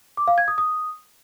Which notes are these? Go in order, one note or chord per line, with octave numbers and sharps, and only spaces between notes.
D6
F5
G#6
D#6
D#6